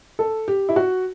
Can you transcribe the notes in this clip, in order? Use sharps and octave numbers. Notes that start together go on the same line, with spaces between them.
A4
G4
E4
F#4